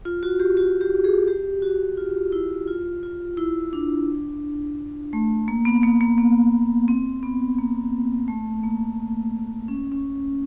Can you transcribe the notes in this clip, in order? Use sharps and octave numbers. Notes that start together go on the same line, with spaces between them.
F4
F#4
G4
F#4
G4
G#4
G4
F#4
F4
E4
F4
F4
E4
D4
A3
A#3
B3
A#3
A#3
B3
C4
B3
A#3
A3
A#3
C#4
C#4